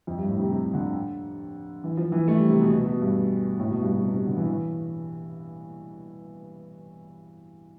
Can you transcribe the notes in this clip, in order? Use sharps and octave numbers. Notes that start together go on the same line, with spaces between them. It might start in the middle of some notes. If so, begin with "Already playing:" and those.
F2
G2
A2
C3
C3
D3
E3
F3
E3
A3
G3
C3
B2
B2
B2
G2
A2
B2
G2
B2
C3
C3
D3
E3
E3